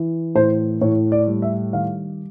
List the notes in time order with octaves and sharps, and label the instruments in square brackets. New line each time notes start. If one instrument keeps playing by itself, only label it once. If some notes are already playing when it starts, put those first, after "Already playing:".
Already playing: [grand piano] E3
A2 C5
A2 C#5
D5
G3
E5
D#3 F5